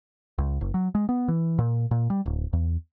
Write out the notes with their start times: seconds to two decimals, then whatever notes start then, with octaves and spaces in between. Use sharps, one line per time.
0.38 C#2
0.61 F#1
0.74 F#3
0.95 G#3
1.09 B3
1.28 E3
1.59 A#2
1.91 A#2
2.10 G3
2.26 D1
2.53 E2